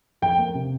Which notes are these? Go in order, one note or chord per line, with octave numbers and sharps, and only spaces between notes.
F2 G5
A#3
C3